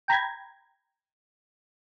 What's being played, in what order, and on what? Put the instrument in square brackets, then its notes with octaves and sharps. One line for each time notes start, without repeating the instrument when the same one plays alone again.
[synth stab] G5 A#5 B5 G#6